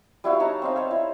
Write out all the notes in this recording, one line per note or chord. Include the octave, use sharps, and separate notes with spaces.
G3 E4 F#4 F5
D#4 C#5 A5 A#5
C4 D#4 F5
C5 C#5 F5
E4